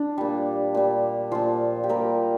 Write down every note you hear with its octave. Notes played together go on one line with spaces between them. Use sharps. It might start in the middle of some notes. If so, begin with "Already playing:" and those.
Already playing: D4
A#2 G3
A#2 G3
A#2 F3 F4
G4
A#2 G3 A#4